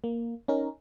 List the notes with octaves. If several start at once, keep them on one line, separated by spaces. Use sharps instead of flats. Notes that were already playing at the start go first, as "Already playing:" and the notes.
A#3
C#4 D#4 A#4